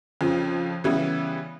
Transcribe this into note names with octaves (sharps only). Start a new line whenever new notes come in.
F2 C#3 F3
C#3 E3 G3 B3 E4